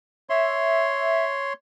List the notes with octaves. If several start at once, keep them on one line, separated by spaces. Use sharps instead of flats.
C#5 E5 C6